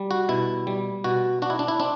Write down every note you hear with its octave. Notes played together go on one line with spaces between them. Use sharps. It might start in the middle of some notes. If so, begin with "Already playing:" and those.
Already playing: G3
F#4
B2 E4
G3
B2 F#4
D4 F#4
E4
D4
E4
C4 D4